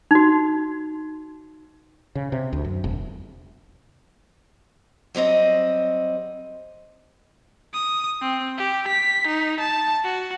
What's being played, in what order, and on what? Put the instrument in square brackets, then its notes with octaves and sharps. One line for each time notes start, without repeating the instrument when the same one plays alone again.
[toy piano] D#4 F#4
[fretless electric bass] C#3
C3
D2
F#2
E1
[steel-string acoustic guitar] F#3 G3 C4 D#5
[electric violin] D#6
C4
G4
B6
D#4
A5
F#4